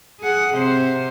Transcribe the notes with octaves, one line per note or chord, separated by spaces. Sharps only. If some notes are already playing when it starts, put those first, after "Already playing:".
G#4 F#5
C3 C5